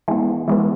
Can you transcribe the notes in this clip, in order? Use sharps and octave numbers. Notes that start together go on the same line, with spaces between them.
E3 G#3 B3
E3 G#3 B3